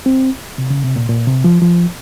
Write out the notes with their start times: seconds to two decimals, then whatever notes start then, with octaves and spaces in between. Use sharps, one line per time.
0.06 C4
0.58 C3
0.70 C#3
0.84 C3
0.96 A#2
1.09 A#2
1.27 C3
1.44 F3
1.62 F3